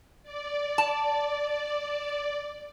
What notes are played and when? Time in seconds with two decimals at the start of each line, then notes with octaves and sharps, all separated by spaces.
0.23 D5
0.78 A5